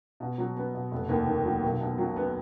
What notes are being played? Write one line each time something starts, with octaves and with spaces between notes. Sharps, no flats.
B2
F#3
B3
B2
F1
D#2
D#3
F#3
B1
B2
F#3
B3